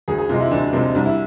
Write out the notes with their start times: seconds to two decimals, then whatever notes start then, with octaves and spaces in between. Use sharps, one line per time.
0.08 D2 G#4
0.18 G#4
0.29 C3 F3 G#3 F4
0.40 E4
0.51 D2 D4
0.73 C3 F3 G#3 C4
0.95 C2 D4
1.05 E4